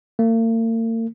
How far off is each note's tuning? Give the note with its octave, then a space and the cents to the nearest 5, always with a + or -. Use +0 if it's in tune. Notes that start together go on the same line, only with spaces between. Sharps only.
A#3 -45